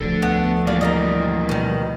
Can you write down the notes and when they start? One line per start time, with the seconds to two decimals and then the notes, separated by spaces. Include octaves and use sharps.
0.01 D2 F3 A4 D5
0.22 A3 B3
0.67 E3 G3 A#3 F4 D5
0.81 A#4 C#5 D#5
1.49 B2 D#3